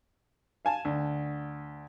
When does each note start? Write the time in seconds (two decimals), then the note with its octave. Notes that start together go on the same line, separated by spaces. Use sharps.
0.65 F5 G#5 A5
0.85 D2